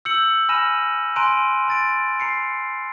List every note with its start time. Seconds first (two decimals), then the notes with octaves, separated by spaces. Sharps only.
0.05 E6 G6 C#7 F#7
0.49 G#5 B5 F6 A#6 D#7 E7
1.16 G#5 A#5 C6 F#6 D7 D#7
1.68 A#5 A6 D7
2.20 A#5 C7 C#7